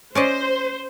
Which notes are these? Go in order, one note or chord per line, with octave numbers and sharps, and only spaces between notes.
C#4 C5 D5 D#5